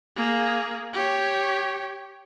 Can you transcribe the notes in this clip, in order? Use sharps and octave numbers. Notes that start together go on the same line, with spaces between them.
A#3 G#4
G4 C#5